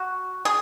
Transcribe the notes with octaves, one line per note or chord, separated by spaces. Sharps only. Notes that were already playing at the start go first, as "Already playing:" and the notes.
Already playing: F#4
G#4